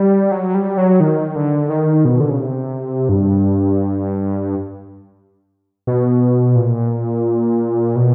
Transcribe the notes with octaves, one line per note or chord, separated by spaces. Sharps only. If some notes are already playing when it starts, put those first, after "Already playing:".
Already playing: G3
F#3
G3
F#3
D#3
D3
D#3
B2
D3
C#3
C3
G2
B2
A#2
B2